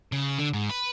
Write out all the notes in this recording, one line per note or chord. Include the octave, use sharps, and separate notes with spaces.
C#3
D3
G#2
B4